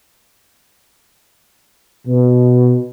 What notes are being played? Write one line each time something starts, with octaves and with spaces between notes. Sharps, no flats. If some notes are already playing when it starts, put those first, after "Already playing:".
B2